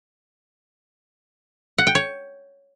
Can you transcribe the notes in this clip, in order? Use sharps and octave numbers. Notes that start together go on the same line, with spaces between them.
F#5
G5
C#5